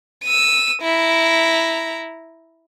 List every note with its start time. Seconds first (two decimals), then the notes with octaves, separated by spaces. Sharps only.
0.24 E6 D#7
0.82 E4 A#5